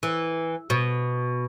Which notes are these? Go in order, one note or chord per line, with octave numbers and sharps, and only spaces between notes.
E3
B2